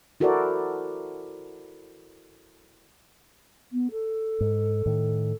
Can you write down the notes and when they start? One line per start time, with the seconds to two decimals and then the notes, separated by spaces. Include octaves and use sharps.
0.20 E4 F#4 A4 A#4 C5 D5
3.72 B3
3.91 A4
4.40 G#2
4.86 A2 D#3